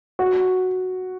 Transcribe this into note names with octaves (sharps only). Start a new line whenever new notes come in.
F#4